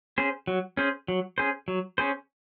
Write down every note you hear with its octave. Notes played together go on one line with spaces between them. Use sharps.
C#4 G#4 C5
F#3
C#4 G#4 C5
F#3
C#4 G#4 C5
F#3
C#4 G#4 C5